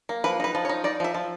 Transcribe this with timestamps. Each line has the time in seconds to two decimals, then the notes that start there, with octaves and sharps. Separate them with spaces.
0.09 A#3
0.24 F3 B4
0.40 D#4 B4
0.55 F3
0.65 C#5
0.69 D#4
0.84 D#4 D5
1.00 F3 E5
1.15 F3